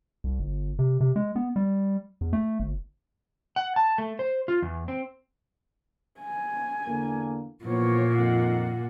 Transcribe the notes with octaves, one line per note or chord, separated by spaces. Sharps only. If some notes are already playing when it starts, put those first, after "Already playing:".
C2
G1
C3
C3
G#3
B3
G3
E2
A3
G1
F#5
A5
A3
C5
F4
E2
C4
G#5
E2 D3 A#3
A#2 E3 F3 A#3 B3 C#5
F2 D#3 F#5